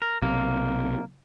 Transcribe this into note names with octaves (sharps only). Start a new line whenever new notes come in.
A#4
B1 C3 A#3